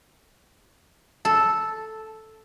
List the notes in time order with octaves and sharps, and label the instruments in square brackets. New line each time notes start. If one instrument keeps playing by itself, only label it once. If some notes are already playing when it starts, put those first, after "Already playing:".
[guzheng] A4